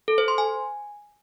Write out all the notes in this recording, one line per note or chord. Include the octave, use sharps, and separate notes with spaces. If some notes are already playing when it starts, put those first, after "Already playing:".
A4
C5
C6
G#5